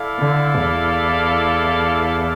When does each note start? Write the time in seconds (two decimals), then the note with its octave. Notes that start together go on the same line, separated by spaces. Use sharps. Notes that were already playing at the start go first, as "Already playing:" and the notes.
Already playing: E4 A4 D5 F5
0.19 D3
0.56 E2